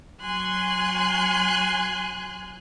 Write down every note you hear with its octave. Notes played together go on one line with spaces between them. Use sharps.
F#3 G#5 C6 F#6